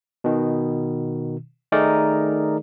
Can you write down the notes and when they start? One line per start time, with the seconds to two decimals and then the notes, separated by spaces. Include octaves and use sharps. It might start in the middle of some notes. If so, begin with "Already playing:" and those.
0.24 B2 D#3
1.72 D#3 A3 D#4 G#4 A#4 D5